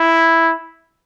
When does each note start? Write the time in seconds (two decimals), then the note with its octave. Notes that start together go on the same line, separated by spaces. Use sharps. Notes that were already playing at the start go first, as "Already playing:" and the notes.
Already playing: E4